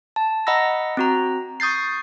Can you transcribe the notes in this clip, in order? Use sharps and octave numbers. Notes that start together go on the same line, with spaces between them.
A5
D#5 F#5 A#5 B5 E6 A#6
C4 F#4 A#5
C#6 D#6 G6 A6 C7